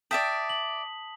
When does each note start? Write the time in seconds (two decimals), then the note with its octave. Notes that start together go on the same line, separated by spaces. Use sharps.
0.11 D5 E5 G5 A5 D#6 B6
0.49 F#7